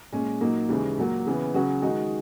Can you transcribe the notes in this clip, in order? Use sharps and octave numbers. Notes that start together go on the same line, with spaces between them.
A#2 G#3 C#4
A#2 F#3 A#3 D#4
D#2 C#3 E3 G#3
A#2 F#3 A#3
C#3 E3 B3
C#3 F#3 C#4 F#4
D#3 G#3 D#4 F#4